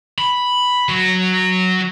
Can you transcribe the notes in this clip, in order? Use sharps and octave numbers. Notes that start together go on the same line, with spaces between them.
B5
F#3 F#4